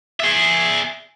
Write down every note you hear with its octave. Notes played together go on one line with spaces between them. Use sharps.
G#4 E5